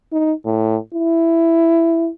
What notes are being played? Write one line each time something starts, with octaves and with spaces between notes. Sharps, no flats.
D#4
A2
E4